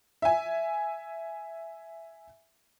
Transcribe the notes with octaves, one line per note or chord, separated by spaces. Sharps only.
E5 G#5